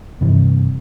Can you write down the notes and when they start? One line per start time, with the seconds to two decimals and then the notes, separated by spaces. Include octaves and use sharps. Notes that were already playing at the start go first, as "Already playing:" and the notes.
0.21 G2 C3 E3